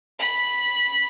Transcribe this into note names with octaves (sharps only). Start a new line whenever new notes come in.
B5